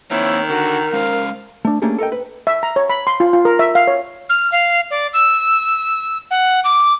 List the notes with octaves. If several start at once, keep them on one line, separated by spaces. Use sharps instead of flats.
D#3 A#3 C4 E4 C#5
D3 F#4 A#4
G#3 C#4 C5 F5
A3 D4
A3 A#3 C#4 D4 G4 G#4
A4 A#4 D#5 G5
B4
E5
A#5
C#5
B5
C6
F4
F4
A#4
E5
F5
C#5
F6
F5
D5
E6
F#5
D6